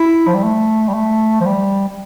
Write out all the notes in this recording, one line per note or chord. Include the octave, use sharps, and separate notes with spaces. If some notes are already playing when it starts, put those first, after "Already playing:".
Already playing: E4
F3
G3
A3
G3
A3
F3
G3
G3